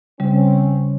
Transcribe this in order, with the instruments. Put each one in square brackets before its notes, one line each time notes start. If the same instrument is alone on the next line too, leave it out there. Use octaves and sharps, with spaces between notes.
[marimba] C#3 G3 [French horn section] C4 C#4